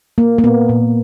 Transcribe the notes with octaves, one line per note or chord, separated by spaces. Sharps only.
A#3
A#3
A#2 B3
A#2